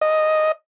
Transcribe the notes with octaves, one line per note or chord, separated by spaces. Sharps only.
D#5